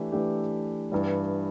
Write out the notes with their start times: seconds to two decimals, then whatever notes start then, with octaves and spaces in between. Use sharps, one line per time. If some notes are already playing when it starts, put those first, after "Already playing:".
Already playing: E3 A3 D4 G4
0.12 E3 A3 D4 G4
0.92 G2 E3 G3